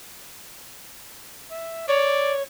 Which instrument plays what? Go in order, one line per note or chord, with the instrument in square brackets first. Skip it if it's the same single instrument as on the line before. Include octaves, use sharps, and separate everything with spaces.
[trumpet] E5
[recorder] C#5 [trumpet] D5